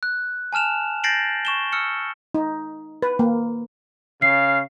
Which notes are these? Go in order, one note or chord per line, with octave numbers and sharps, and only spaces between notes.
F#6
G#5 A5 F6 E7 F7
G6 A6 A#6 C7 D7 F#7
C#6 E7 G7
E6 F6 C#7
D#4
B4
A#3
C#3 F5 C7